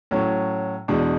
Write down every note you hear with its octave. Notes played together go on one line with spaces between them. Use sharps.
A2 F#3 C#4
E2 B2 G#3 D4